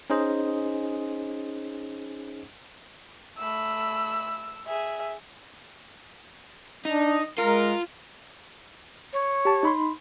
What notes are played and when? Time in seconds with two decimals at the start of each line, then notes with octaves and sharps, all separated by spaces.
0.10 C#4 D#4 G#4 C5 D#5
3.38 A3 B5 E6
4.67 G#4 E5
6.85 D4 D#4
7.38 G#3 F4 A#4
9.13 C#5
9.45 G4 A5
9.63 D#4 B5 C6